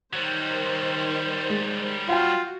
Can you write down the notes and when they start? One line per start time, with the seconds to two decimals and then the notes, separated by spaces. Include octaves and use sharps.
0.13 D#3 F#3 G3 C5
1.50 G#3
2.09 F4 F#4 F#5 G5